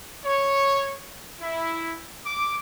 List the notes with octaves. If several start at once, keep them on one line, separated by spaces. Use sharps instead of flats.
C#5
E4
D6